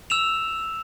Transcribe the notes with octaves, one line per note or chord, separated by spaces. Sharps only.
E6 E7 F7